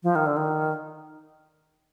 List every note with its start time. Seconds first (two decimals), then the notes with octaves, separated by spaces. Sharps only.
0.03 F3
0.15 D#3
0.26 D3
0.37 D#3